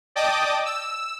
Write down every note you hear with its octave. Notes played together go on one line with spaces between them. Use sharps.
D5 D#5 G5 A5 D6 D#6
E6